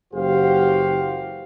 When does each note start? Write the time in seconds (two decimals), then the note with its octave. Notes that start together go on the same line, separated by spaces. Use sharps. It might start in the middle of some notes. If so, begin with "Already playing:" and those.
0.13 F#1 E3 F#4 G4 C5 F5